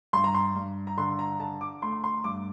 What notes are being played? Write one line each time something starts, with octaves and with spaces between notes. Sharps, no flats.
G2 C6
A#5
C6
G2
A#5
D3 C6
A#5
D3 A5
D6
A3 C6
C6
G2 D6